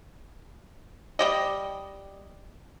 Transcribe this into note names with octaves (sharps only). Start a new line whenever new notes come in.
G3 G4 D#5